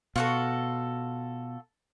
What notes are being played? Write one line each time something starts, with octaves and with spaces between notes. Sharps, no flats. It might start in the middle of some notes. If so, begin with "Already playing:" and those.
B2 F4 F#4 A4